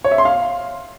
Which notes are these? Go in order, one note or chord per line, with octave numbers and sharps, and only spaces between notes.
C#5
E5
C6
F5